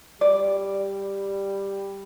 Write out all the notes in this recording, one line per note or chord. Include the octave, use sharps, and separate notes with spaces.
G3 D5